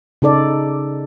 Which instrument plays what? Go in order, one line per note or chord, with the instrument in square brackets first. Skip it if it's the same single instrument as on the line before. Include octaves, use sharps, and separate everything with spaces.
[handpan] C#3 D#4 A4 D5